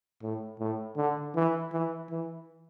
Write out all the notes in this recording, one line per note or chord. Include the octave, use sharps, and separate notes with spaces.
A2
A2
D3
E3
E3
E3